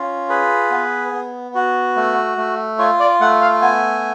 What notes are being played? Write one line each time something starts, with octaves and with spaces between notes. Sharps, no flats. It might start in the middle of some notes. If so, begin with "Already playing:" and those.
Already playing: C#4 F4
G#4 B4
B3
B3
F#4
A3
A3
F4 C#5
D5
A3 F#5
F5
B3 G#5